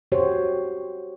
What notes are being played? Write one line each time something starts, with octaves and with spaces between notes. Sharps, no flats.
F#4 G4 C5 C#5